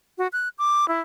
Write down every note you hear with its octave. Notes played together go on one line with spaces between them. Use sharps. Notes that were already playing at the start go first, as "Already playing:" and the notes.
F#4
F#6
D6
E4